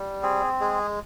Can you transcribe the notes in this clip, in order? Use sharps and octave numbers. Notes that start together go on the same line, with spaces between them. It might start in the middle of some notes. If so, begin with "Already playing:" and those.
Already playing: G3
C4 G#4
G#3 G#4